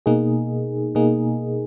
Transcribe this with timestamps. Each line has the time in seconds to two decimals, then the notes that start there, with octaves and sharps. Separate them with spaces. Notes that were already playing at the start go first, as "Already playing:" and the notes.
0.06 B2 A#3 D#4 G#4
0.95 B2 A#3 D#4 G#4